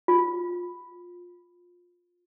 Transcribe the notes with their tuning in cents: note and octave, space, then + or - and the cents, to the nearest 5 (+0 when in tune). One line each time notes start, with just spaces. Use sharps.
F4 +15